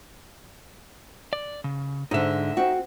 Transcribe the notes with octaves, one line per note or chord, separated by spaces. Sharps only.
D5
C#3
G#2 D3 D#4 E5
C4 F#4